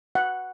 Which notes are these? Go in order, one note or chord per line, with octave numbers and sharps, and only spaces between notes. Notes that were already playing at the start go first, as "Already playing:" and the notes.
F#5